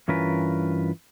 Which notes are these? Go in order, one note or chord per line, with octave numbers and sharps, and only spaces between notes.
G2 E3 C#4 F4 A#4 B4